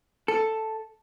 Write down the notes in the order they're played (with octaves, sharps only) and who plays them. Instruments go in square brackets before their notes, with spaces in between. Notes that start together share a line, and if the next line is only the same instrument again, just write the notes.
[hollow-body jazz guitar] A4